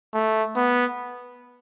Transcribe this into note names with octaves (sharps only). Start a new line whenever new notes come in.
A3
B3